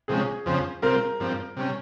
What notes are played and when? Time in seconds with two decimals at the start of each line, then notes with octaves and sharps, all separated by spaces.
0.08 C3 F3 G#3 C#4 G#4
0.46 F2 C#3 F3 C4
0.82 C3 G3 C4 F4 A#4
1.20 G2 F3 C4
1.57 C3 G3 C#4